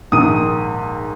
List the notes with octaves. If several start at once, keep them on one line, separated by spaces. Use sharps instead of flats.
A#1 G#2 D#3 D#6 D#7